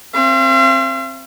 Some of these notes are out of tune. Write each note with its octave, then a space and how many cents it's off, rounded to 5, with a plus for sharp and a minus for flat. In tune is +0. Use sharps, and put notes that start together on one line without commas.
C4 +20 F5 -45